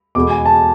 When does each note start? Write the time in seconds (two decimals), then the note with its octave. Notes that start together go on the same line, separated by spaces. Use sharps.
0.15 E2 B2 G#3 B3 D6
0.30 G#5
0.46 A5